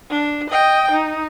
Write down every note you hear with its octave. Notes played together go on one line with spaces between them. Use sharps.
D4
D#5 G5
D#4